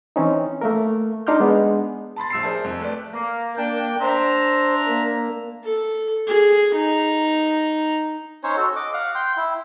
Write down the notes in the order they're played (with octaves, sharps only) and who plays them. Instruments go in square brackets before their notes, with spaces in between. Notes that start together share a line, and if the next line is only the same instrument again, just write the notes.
[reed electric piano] E3 C4 C#4 D#4
A3 A#3 A#4
D4 D#4 C6 D6 F6 G6
G#3 B3 D4
[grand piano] A5 B5 C6 A6
A#1 E6 C7
G#4 A#4 C5 D5 E5 A5
F2
A3 B4 D5
[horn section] A#3
[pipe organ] A#3 G5 [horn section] D4
[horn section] D4 E5 A#5 [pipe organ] C5
[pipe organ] A#3
[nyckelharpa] A4
G#4
D#4 A#5
[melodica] C#4 D#4 C5 C#5
F#4 A4
D#5 D6
F5 F#5
G5 C6
E4